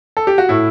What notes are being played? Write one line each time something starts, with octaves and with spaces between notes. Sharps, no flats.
A4
G4
F#4
A2 E4